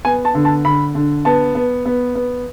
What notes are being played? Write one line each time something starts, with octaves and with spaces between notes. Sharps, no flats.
B3 G#5
A5
D3
A5
D3 B5
D3
B3 A5
B3
B3
B3